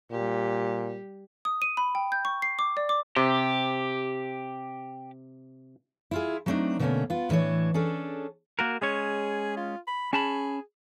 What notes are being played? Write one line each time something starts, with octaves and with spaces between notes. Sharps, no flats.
A#2 G3 G4
D#6
D#7
B5
G5
G6
C#6
C7
D6
D5
D6
C3 G4
E4 F4 G#4
F#3 G3 A3 C4 D4 D#4
B2 D3 A3 A#3 C#4
B3 F4
A2 E3 D4 C#5
C#4 D4 G#4 A4
A#3 F#4 A#4
G#3 C#4 G#4 C#5
F4
B5
C#4 G#4 A5 B5